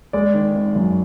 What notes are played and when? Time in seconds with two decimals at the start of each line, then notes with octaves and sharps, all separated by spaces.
0.13 G#3 D5
0.34 D#3
0.55 G#1
0.76 F#2